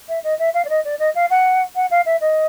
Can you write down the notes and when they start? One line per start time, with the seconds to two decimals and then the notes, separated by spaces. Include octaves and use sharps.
0.08 E5
0.23 D#5
0.39 E5
0.54 F5
0.64 D5
0.69 D#5
0.84 D5
0.99 D#5
1.15 F5
1.30 F#5
1.75 F#5
1.90 F5
2.05 E5
2.20 D#5